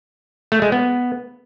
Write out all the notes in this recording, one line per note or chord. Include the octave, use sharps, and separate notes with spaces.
A3
G#3
B3